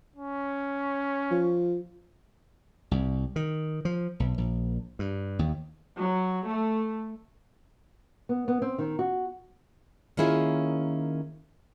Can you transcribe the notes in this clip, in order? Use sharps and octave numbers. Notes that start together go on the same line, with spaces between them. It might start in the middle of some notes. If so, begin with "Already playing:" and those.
C#4
F3
C2
D#3
F3
B1
A#1
G2
D#2
F#3
A3
B3
B3
C4
D#3
F#4
D#3 A#3 C#4 E4 F4 G#4